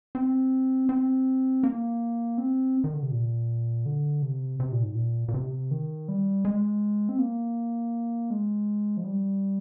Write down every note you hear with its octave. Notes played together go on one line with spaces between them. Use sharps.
C4
C4
A#3
C4
D#3
D3
C3
A#2
D3
C3
C3
A#2
G#2
A#2
A#2
C3
D#3
G3
G#3
C4
A#3
G#3
F3
G3